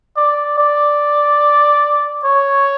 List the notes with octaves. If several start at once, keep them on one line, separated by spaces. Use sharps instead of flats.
D5
D5
C#5